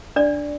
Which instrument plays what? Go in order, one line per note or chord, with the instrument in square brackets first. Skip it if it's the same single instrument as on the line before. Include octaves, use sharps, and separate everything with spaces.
[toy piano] D4 D5